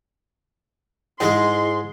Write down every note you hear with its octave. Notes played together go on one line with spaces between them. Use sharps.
G#2 G#3 E4 G#4 D#5 C6